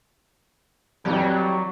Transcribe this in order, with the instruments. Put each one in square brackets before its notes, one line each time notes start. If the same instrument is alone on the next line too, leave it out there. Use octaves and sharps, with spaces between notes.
[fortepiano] F2 E3 [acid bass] F#3 [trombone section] G3